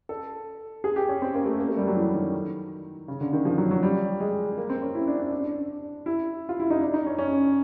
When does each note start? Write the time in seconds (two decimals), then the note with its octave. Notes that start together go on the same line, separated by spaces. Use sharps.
0.09 A4
0.84 G#4
0.96 G4
1.09 C#4
1.22 C4
1.34 A#3
1.46 A3
1.59 A#3
1.69 A3
1.77 G3
1.87 F#3
1.96 E3
2.14 D#3
3.08 C#3
3.21 D3
3.33 D#3
3.45 F3
3.58 F#3
3.71 F#3
3.83 G3
4.20 G#3
4.57 A#3
4.70 C4
4.82 C#4
4.95 E4
5.07 D4
5.19 D4
5.32 D4
5.44 D4
6.06 E4
6.49 F4
6.60 E4
6.70 D#4
6.81 D4
6.94 D#4
7.07 C#4
7.19 C#4